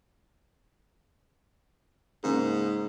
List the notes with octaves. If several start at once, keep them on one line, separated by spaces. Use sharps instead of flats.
G#2 C#3 A#3